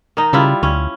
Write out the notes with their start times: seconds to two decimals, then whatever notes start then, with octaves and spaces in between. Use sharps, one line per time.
0.17 D#3 D#4
0.33 C#3 G3 E4 F4
0.63 D2 C#4